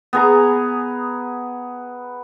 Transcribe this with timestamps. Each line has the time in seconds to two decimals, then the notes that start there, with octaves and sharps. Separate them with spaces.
0.13 B3 G#4 A#5